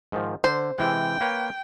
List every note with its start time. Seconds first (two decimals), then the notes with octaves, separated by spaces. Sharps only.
0.12 G#2 D#3 F3
0.44 D3 C5
0.79 C3 E3 G#3 G5
1.21 A#3 B4 C#5